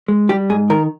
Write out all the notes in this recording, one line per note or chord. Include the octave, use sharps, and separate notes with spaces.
G#3
G3 G4
G#2 G#4
D#3 A#4